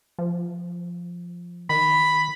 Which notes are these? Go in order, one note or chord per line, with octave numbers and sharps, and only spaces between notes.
F3
D#3 B5